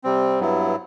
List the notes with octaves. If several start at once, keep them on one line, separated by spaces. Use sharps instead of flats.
C3 G3 C4
G2 F#3 B3 E4